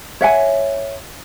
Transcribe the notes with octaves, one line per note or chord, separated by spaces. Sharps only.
C#5 E5 F#5 G#5